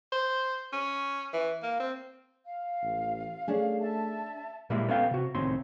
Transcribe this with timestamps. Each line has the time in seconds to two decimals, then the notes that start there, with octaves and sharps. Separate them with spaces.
0.12 C5
0.73 C#4
1.33 E3
1.63 A#3
1.80 C4
2.45 F5
2.83 A1
3.48 A3 C#4 D4 G#4
3.80 E5 A5
4.70 A#2 G3 G#3 A#3 E4
4.89 B3 C#4 A4 F5 G5
5.11 C3 F#4
5.35 C2 A2 D#3 C4 C#4 C6